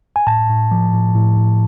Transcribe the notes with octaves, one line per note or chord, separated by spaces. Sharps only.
G#5
A2 A5
A2
F3
A2
A2
A2